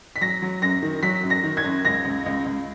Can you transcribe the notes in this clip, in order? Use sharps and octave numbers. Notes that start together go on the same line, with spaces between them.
B6
F#3 A#6
F#3
F#2 A#6
D#3
F#3 B6
F#2
A#6
D#3
G#6
F#2
C#2 A#6
C#2
C#2
C#2